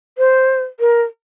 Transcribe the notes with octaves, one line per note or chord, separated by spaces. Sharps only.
C5
A#4